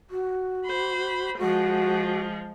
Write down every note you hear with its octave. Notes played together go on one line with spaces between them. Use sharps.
F#4
C5 B5
F3 G#3 F#4